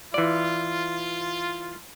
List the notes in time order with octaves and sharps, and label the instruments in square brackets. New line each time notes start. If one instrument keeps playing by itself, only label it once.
[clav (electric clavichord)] E3 D5 [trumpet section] F4